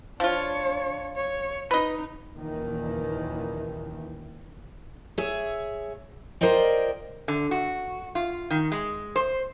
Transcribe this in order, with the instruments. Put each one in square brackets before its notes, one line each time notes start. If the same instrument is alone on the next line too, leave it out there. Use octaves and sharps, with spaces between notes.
[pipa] F3 F4 [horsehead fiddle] D4 C#5
[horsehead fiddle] C#5
[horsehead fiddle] D#4 [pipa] B4 D#5
[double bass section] F#1 D#2 A#2 D#3 E3
[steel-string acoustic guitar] G#4 C#5 E5
F4 A#4 C5 D5 D#5 G5
[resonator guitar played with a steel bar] D3
F#4
F4
D#3
G#3
C5